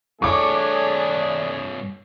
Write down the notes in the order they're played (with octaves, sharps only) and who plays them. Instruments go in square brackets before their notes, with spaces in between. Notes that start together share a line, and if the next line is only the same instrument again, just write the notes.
[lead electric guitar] G2 C#5 [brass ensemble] A3 D4 G#4 [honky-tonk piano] C#6 D6